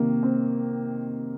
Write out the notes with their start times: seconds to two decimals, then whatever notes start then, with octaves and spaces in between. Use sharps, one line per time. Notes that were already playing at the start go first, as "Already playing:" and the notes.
Already playing: C3 D#3 A#3
0.23 C4